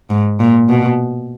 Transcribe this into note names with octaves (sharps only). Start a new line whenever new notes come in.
G#2
A#2
B2